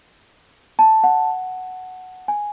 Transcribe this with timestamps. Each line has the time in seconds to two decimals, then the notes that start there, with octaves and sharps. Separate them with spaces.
0.79 A5
1.04 F#5
2.28 G#5